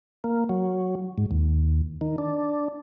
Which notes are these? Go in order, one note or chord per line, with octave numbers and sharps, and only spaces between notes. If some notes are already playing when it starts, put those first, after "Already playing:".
A#3
F#3
G#2
D#2
D#3
D4